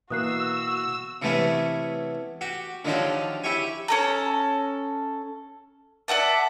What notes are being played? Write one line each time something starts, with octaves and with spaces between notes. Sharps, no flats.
B2 E3 A#3 F#4 D#6 E6 F#6 C7
C3 E3 A3 B3 C#4
F#4 G4
D3 D#3 F3 F#3 G4 D5
E4 G4 C#5 G#5
C#4 A4 A#5
D5 E5 F#5 A5